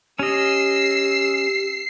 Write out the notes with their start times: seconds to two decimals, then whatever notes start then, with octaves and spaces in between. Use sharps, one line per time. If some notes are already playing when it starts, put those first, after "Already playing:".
0.19 C#4 G4 D#5 E6 C7